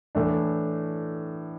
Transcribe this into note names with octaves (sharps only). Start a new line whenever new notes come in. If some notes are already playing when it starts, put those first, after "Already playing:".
A2 E3 A3 D4